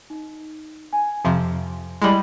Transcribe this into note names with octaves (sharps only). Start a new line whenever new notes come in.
D#4
G#5
F2 C3 F3
G3 G#3 E4 B5 F#7